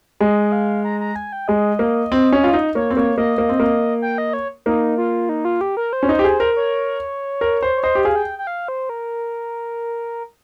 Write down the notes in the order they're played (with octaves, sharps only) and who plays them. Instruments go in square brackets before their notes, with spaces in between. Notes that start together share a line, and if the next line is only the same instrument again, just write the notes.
[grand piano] G#3 [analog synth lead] D#5
[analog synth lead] F5
A#5
A#5
G#5
G5
[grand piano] G#3 [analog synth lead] D#5
[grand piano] A#3
C4
C#4
F4
D#4
[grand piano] A#3 [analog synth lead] C#5
[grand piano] C4
[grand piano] A#3 [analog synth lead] C#5
[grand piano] A#3 [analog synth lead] D#5
[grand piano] A#3
C4
A#3
[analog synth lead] G5
D#5
C#5
[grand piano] A#3 [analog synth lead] D#4
[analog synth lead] F4
D#4
F4
G4
A#4
C5
[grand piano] C#4
D#4
G4
G#4
A#4
[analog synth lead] C#5
[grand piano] A#4
C5
[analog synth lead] C#5
[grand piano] C5 [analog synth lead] D#5
[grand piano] G4
[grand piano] G#4 [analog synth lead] F5
[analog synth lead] G5
G5
F5
C5
A#4